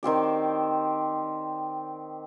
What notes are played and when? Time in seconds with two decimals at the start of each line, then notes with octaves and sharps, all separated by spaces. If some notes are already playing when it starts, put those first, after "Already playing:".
0.03 D#3 C4 G4 D5